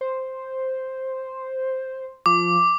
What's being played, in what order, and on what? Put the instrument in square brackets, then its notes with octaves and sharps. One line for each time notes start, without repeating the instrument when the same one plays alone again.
[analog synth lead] C5
[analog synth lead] F3 [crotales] D6